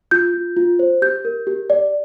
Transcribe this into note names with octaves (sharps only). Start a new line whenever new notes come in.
F4 G6
F4
F4
C5
G4 G6
A#4
G4
D5